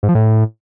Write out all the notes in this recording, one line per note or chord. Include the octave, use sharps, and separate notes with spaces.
G#2
F3
A2